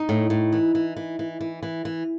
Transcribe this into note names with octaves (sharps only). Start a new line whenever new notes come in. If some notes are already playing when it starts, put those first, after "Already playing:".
Already playing: D#4
A2
A2
E3
E3
E3
E3
E3
E3
E3